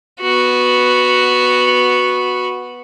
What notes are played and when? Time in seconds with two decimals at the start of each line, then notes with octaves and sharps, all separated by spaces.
0.20 B3 F#4